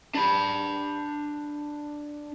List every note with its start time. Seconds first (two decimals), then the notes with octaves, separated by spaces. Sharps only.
0.15 D4 B5